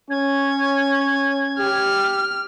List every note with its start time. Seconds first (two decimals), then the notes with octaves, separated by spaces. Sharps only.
0.11 C#4 C#5 G#6
1.59 G4 F6